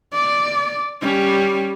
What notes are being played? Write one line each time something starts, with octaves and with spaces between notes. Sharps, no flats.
D5
G3 C#4